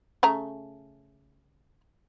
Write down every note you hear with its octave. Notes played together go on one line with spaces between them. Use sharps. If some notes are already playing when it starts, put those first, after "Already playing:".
C#3 A3 A#5